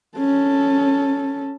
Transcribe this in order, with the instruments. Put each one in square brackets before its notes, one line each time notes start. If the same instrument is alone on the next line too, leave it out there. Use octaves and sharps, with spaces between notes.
[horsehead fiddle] C#4 A4